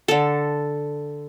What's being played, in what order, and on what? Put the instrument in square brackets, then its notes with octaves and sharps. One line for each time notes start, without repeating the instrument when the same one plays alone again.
[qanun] D3 A4